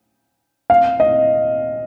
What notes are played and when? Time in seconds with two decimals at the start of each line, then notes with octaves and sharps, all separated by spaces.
0.70 F5
1.00 D#5